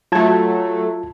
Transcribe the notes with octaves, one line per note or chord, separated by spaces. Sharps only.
F#3 A3 F4 A5 G#6